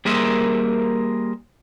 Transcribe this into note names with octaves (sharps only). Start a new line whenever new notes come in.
G3 A#3 G#4 A#4 C5 E5